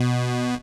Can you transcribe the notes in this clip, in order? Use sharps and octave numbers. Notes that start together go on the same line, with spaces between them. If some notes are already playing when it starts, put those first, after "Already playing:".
Already playing: B2